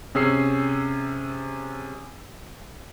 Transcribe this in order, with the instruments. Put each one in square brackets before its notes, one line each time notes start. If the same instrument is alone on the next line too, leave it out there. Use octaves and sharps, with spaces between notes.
[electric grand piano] C3 C#4 G#4 E6 C7